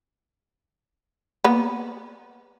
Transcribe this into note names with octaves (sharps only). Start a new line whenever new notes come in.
A#3 B3